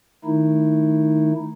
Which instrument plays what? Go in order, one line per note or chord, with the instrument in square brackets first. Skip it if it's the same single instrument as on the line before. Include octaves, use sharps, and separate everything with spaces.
[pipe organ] D#3 A3 D#4 E4